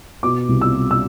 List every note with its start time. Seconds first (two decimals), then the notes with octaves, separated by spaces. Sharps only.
0.23 B2 D6
0.49 C2
0.61 E6
0.75 G3
0.91 E6